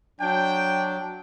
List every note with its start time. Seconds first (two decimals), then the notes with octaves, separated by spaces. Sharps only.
0.21 F#3 D4 G5